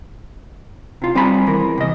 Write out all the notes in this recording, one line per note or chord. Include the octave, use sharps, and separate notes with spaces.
C3 F4
G3 C4 F4 G#5 A#5 B5
E2 E3 A#4
C3 D#5